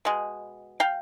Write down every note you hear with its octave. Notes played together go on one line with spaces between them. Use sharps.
B2 G#3
F5 G5